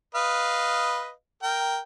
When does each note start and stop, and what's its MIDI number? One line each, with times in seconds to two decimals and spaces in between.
0.15 1.11 71
0.15 1.11 75
0.15 1.11 77
1.43 1.79 70
1.43 1.79 79